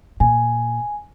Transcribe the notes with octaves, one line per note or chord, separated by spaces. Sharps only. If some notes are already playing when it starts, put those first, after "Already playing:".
A#2 G#5